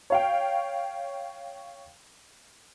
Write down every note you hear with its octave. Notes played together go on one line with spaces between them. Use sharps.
C#5 F5 G5